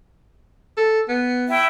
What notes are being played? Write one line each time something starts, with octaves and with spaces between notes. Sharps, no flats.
A4
B3
E4 E5 G5